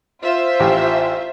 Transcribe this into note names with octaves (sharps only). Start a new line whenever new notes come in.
F4 C5 E5
A1 G4